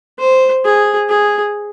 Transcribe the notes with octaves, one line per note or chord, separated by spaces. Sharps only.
C5
G#4
G#4